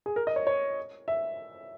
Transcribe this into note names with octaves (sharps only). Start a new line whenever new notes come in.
G#4
A#4
D#5
C#5
C#5
E5